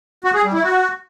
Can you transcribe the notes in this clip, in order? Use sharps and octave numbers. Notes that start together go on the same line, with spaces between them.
F#4
G#4
G3
E4
F#4